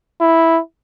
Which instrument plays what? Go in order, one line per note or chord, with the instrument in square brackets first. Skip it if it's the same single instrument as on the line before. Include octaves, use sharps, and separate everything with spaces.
[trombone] E4